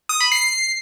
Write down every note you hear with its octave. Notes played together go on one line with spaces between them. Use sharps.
D#6
B5
C7